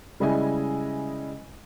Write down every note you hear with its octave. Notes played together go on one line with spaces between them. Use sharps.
C#3 G3 G#3 E4 D#5 G#5